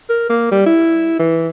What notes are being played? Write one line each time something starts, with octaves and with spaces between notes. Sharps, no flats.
A#4
A#3
G3
E4
E3